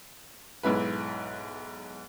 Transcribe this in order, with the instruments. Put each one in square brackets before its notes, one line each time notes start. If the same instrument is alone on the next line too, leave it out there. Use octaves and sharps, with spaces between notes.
[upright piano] B1 G#2 E4 B4